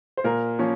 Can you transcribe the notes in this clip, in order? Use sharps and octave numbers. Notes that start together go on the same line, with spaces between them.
C5
A#2 A#4
F3 A#3 C#4